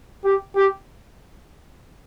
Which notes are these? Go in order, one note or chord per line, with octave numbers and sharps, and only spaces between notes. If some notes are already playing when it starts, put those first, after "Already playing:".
G4
G4